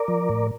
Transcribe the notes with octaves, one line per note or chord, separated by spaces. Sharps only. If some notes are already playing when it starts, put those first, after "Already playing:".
Already playing: A#4 D5
F3
A2